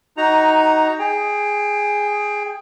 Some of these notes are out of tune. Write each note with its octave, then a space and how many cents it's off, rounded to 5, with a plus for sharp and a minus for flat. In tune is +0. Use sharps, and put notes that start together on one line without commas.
D#4 +15 F#4 +20 A#5 +0
G#4 +0 G5 +20